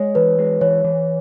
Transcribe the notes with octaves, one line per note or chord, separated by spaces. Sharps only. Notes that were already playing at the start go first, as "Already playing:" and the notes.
Already playing: G#3 C#5
E3 B4
G#3
E3 C#5
E3